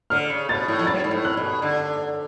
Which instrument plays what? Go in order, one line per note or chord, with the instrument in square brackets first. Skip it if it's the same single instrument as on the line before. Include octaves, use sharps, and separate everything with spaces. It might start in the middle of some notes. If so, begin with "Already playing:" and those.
[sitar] D3 [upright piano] F6
[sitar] C#3
[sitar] B2 [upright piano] A6
[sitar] A2
F2
[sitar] F#2 [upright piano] A6
[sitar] G#2
A2
[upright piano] F#6
[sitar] B2
D3